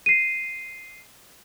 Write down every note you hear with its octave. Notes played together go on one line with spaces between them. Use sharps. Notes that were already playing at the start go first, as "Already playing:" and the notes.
C7 D#7